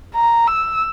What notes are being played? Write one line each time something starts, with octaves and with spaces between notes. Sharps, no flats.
A#5
E6